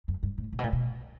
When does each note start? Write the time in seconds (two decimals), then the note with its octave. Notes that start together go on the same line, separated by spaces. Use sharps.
0.08 F#2
0.23 G2
0.38 A2
0.53 A#2
0.59 B2
0.63 A#2
0.73 B2